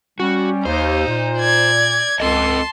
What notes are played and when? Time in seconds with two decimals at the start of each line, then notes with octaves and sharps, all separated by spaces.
0.20 G3 C#4 F#4
0.65 D#2 D#4 C5
1.07 A#2
1.38 D5 G#6
2.20 C#2 C4 A4 D#5 A5 C6